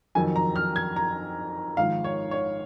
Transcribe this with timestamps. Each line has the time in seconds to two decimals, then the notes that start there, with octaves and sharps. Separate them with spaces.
0.15 F2 D#3 F#3 G#5
0.36 A#5
0.56 F6
0.76 G#6
0.96 A#5
1.77 G#1 G#2 F3 F5
2.04 C#5
2.31 C#5